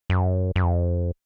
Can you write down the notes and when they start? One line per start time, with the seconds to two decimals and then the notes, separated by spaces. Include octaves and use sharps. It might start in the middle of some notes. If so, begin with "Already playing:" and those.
0.10 F#2
0.56 F#2
0.63 F2